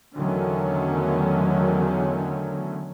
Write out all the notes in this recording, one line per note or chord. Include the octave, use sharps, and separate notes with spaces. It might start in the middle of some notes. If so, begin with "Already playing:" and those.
E2 D3 D#3 F#3 A3 C#4